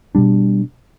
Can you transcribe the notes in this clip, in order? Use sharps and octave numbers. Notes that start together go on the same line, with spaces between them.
B2 G3 D4